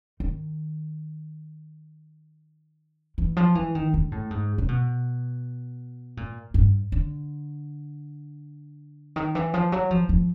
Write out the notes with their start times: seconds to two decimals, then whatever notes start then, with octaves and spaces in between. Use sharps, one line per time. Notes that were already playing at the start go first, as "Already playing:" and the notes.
0.20 D#3
3.18 E3
3.37 F3
3.55 E3
3.75 D#3
3.94 D3
4.12 A2
4.31 G#2
4.58 C3
4.68 B2
6.17 A#2
6.54 G2
6.92 D3
9.16 D#3
9.35 E3
9.54 F3
9.72 F#3
9.91 F3
10.09 F3